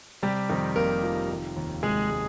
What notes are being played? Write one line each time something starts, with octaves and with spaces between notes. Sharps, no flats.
C3 G3 G4
F2 D#3 D#4
F1 A#3 A#4
F3
D#3
D#2
F1 G#3 G#4
G#3